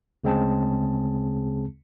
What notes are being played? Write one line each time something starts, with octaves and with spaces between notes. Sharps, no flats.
D2 C#3 G#3 C4 G#4 A5